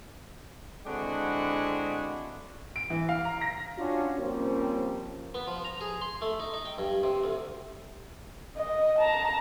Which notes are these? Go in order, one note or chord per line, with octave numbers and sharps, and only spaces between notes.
D3 G#3 C4 D4 E4 F#4
D7
E3
F5
A#5
A#6
C#4 D4 F4 F#4
F3 G3 A#3 C4 C#4
B3
F3
A#5
G#4
C6
A3
D#4
D#4
G5
G2
C3
D2
D#5
A5 A#5